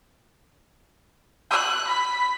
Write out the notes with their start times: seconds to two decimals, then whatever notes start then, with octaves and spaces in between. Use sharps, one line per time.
1.50 F#6
1.88 B5